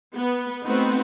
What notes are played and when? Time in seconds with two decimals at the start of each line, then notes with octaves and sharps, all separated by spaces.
0.16 B3
0.65 A3 B3 C4 D#4 F#4 B4